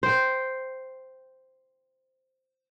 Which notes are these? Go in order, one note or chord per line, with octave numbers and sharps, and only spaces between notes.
C5 G5